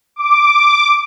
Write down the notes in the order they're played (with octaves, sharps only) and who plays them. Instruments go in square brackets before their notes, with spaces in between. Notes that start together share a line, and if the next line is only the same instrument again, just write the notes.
[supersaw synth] D6